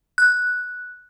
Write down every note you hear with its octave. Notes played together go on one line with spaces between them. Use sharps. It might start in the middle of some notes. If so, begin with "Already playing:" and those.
F#6